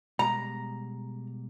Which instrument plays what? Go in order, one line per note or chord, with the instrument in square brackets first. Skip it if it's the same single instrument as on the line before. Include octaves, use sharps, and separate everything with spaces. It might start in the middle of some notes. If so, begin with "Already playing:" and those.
[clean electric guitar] B2 G3 G#3 [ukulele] A#5